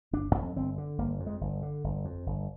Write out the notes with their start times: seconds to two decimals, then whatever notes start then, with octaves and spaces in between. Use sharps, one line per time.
0.13 G1 D4
0.35 F2
0.56 G1 C4
0.78 D3
0.98 G1 A#3
1.20 F2
1.26 G#3
1.41 G1
1.62 D3
1.84 G1
2.05 F2
2.26 G1